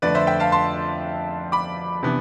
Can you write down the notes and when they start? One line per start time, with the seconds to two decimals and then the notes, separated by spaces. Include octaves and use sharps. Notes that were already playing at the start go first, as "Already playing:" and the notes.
0.02 F2 D3 A3 B4 D5
0.15 C5 E5
0.27 E5 G5
0.40 F5 A5
0.52 A5 C6
1.52 B5 D6
2.03 C3 E3 B3 D4